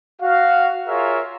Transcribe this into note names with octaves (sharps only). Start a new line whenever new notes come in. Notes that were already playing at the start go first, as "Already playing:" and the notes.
F#4 F5
F4 G#4 A#4 C#5 E5 F5